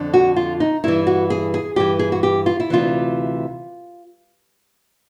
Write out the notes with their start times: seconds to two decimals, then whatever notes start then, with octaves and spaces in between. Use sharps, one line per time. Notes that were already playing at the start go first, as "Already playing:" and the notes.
Already playing: F2 D3
0.14 F#4
0.36 F4
0.60 D#4
0.84 G2 E3 E4
1.07 F#4
1.30 G#4
1.54 G#4
1.76 G2 E3 G4
1.99 G#4
2.12 F#4
2.23 G4
2.46 F4
2.60 E4
2.70 D2 C3 E3 F4